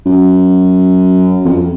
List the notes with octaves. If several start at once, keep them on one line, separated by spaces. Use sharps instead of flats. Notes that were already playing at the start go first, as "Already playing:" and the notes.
F#2
F2